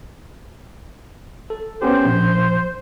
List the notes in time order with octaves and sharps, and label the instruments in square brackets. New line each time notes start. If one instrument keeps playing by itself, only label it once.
[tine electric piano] A4
[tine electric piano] B3 C#4 G4 [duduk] C5
[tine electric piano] A#1